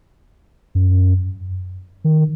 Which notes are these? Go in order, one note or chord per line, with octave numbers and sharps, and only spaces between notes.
F#2
D#3